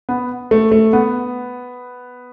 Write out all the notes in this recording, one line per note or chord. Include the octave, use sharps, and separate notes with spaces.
B3
A3
A3
B3